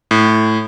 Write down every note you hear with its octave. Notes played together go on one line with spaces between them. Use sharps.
A2